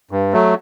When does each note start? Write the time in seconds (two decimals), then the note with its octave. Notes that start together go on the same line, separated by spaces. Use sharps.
0.11 G2
0.33 F#3 A3